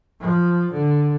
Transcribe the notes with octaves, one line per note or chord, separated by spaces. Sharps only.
F3
D3